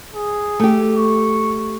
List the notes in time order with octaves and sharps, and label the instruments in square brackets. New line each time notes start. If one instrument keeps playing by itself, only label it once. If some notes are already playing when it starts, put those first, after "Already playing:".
[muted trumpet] G#4
[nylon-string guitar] A3 G4
[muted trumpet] C#6